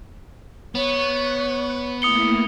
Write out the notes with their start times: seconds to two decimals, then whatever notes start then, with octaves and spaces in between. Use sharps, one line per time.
0.75 B3 C#5 C#6 F#6
2.02 A3 A#3 E4 D#6 C#7 G7